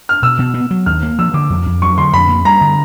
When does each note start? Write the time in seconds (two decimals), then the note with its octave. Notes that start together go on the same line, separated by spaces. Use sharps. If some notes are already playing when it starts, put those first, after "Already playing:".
0.09 F6
0.23 B2 E6
0.39 B2
0.54 B3
0.71 F#3
0.86 D#2 F6
1.03 A#3
1.19 F3 E6
1.34 D3 D6
1.50 F2
1.66 F2
1.82 F#3 C#6
1.98 D3 C6
2.13 F2 B5
2.29 A#3
2.45 G3 A#5
2.61 D3